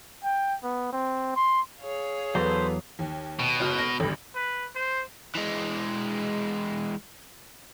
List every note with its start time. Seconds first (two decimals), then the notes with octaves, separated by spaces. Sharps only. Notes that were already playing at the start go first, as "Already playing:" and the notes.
0.24 G5
0.63 B3
0.93 C4
1.36 C6
1.80 G#4 C#5 F5
2.35 E2 F#3 A4 B4 C5
2.99 D#2
3.39 B2
3.60 F#1 F#4 F6
3.79 A#6 D7
4.00 G#1 D2 G2
4.35 B4
4.75 C5
5.35 E3 G#3